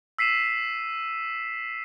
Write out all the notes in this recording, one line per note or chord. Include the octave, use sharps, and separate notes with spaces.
E6 B6 C7 D#7 E7